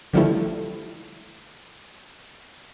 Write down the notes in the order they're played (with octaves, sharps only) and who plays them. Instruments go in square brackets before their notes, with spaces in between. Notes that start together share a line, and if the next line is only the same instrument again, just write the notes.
[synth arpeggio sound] D3 D#3 F3 G3 A3 E4